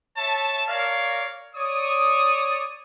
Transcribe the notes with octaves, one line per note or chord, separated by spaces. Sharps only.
C#5 E5 A5
A#4 C#5 D5 F5
C#5 D5 D#6